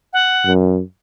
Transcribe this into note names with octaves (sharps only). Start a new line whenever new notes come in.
F#5
F#2